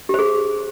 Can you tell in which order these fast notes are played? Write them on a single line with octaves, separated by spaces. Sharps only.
G4 C5 G#4